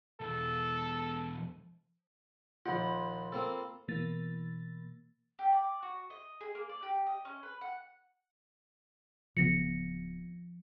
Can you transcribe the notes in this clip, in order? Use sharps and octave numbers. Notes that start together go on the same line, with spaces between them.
E2 B2 A4
A#1 D#2 F4 F#5 B5
A#3 C4 A4
B2 E3 A#3 A6
G4
D5
F#4
D#5
G#4
A#3
D5
G4
D#5
C#4
B4
F#5
D1 C#3 F3 B3 A#6 C#7